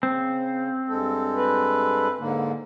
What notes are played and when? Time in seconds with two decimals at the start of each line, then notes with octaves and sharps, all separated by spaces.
0.03 C#3 C4
0.89 G2 G#3 A4
1.37 B4
2.19 G#2 D3 A#3